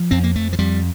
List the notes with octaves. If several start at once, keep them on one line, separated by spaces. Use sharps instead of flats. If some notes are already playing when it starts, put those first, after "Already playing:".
Already playing: F3
F2 C4
A#3
F2 A3
F3
F2 G3